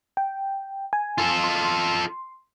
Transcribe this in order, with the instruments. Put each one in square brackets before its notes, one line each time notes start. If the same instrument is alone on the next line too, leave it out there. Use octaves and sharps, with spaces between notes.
[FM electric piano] G5
G#5
[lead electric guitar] F4 A4
[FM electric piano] C6